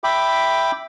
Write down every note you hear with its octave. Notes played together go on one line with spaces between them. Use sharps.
E5 G5 B5 D6